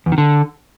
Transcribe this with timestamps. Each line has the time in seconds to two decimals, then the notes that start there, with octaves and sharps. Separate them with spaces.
0.06 E2
0.12 D#3
0.18 D3